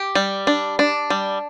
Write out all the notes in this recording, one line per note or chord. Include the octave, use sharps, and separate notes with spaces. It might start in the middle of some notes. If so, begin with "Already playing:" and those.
Already playing: G4
G3
D4
D4
G3